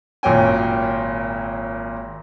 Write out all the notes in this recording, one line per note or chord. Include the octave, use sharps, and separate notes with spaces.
G#1 A#2 F#3 C#4 G5 G#5